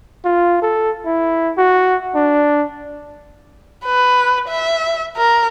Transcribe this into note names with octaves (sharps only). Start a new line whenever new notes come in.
F4
A4
E4
F#4
D4
B4
E5
A#4